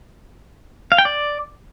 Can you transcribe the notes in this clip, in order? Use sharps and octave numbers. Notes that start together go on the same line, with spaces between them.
F5
G5
D5